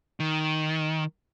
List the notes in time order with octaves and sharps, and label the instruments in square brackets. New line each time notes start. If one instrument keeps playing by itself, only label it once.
[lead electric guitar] D#3